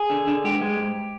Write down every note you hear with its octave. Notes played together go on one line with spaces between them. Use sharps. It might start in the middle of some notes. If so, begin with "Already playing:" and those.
Already playing: G#4
D3
D3
G#2 G4
G#3
G#2